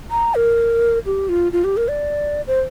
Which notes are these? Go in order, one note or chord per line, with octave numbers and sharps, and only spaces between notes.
A#5
A#4
G4
F4
F4
G4
A#4
D5
C5